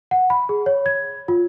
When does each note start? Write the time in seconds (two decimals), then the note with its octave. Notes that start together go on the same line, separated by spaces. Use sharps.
0.11 F#5
0.30 B5
0.49 G#4
0.66 C#5
0.86 G#6
1.28 F4